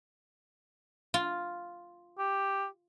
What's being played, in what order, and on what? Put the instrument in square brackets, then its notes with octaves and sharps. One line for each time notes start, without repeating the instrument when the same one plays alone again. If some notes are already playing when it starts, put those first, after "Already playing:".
[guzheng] F4
[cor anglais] G4